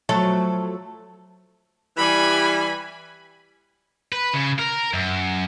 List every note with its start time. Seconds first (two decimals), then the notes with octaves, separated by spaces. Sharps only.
0.09 F3 F#3 A3 A4
1.97 E3 G3 G#5 B5
4.12 B4
4.34 C#3
4.59 A#4
4.94 F#2